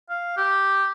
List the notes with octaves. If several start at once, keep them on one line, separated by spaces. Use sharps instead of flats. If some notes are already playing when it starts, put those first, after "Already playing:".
F5
G4